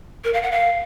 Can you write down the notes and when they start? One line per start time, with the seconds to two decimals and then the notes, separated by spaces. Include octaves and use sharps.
0.24 A#4
0.33 F5
0.43 F#5
0.52 F5